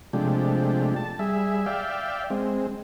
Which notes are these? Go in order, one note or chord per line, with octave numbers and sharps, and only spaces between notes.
C3 F3 G#3 A3 D4 G4
A5
G3 G#4 E5
D5 E5 F5 G5
G#3 C4